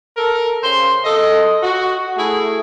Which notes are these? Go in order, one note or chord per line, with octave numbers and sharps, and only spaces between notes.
A4 A#4
C#3 C5 C6
A4 D#5
F#4
A3 E4 G#4